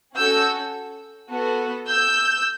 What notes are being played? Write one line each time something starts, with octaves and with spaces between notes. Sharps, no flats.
C#4 F#4 A4 E6 G6
B3 F#4 A4
E6 G6